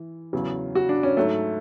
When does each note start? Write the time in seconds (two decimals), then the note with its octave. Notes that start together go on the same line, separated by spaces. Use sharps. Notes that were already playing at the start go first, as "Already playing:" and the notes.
Already playing: E3
0.33 E2 C#3 F#3
0.75 F#4
0.89 D4
1.03 C#4
1.17 G#2 F#3 A3